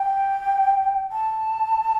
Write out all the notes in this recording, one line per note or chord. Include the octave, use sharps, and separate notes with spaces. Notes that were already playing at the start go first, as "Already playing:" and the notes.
Already playing: G5
A5